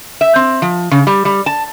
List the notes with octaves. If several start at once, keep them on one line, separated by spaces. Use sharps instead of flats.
E5
C4
F3
C#3
G3
G3
A5